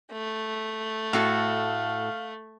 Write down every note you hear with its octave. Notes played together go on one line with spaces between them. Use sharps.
A3
A2 F#4 A4 F5